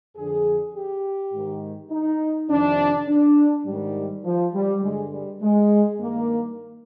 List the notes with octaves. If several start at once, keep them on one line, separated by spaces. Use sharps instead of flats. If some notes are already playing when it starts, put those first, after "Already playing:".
F2 D3 G#4
G4
G#2 D#3
D#4
F2 C3 D#3 D4
D4
G#2 D#3 G3
F3
G3
G2 D3 G#3
G3
G#3
G2 D#3 A#3